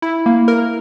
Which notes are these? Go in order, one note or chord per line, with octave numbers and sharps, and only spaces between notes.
E4
A#3
A#4